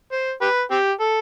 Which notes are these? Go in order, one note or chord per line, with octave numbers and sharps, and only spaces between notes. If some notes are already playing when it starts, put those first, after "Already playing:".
C5
G4 B4
C4 G4
A4